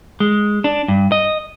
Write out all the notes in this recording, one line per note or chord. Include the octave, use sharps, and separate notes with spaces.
G#3
D4
G2
D#5